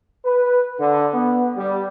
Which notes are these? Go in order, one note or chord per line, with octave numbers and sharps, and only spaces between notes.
B4
D3
B3
G3